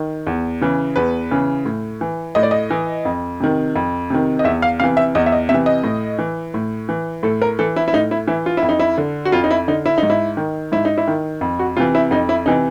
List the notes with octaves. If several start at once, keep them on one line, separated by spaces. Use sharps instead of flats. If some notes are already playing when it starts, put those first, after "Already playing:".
Already playing: D#3
E2
C#3 E3
E2 B4
C#3 E3
A2
E3
A2 D#5
D5
D#5
E3
F2
C3 D#3
F2
C3 D#3
D#5
E2 E5
F5
C3 E3 F5
E5
E2 D#5
E5
D#5
C3 E5
E3
D#5
A2
E3
A2
E3
A2 A4
A#4
E3 A4
E4
E4
A2 D#4
E4
E3 E4
F4
E4
F2
D#4
E4
D3
F#4
F2 F4
D#4
E4
D3 D#4
E4
G#2 D#4
E4
D#3
G#2 E4
D#4
E4
D#3
F2
F#4
C3 E3 F4
E4
F2 D#4
E4
C3 E3 D#4